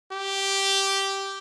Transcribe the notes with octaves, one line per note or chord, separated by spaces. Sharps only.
G4